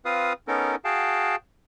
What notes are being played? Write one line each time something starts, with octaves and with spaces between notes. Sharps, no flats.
C4 F4 B4 F5 D#6
B3 C#4 D#4 A4 A#4
F#4 G#4 F5 G5 A5